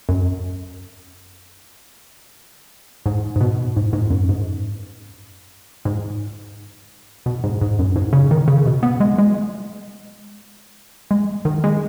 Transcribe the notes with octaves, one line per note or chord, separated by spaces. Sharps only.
F#2
G#2
G#2
B2
G#2
G#2
F#2
G#2
G#2
B2
G#2
G#2
F#2
G#2
C#3
D#3
C#3
B2
B3
G#3
G#3
G#3
D#3
G#3